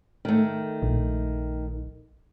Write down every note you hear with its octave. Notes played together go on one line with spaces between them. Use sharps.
D#3 A3
A#1